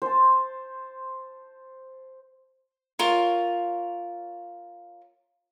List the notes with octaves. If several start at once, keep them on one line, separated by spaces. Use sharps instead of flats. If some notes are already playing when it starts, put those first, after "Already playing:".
C5 A5
F4 A#4 C#5